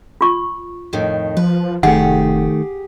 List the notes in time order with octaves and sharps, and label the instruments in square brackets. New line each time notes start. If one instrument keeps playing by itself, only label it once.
[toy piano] F4 C#6
[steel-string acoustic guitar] F2 A2 D#3
[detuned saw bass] F3 [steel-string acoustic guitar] B4
[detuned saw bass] F1 [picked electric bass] D#3 A3 [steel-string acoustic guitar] G4 G#4 [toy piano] F#5